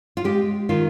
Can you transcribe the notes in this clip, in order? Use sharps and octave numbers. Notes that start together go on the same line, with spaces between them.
F4
G#3 G4
D#3 F4